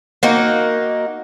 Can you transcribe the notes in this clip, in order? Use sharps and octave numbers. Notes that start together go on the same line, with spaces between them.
A#3 D#4 F#4